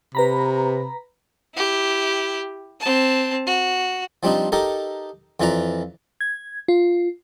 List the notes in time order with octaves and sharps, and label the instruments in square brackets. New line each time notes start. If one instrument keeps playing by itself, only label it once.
[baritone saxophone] C3 [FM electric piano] B4 A#5 B5
[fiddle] E4 G4
C4 A5
F#4
[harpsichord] F3 G3 C4 D4 D#4
D#4 G4 A4 A#4
F2 E3 F4 B4 D5 A#5
[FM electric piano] G#6
F4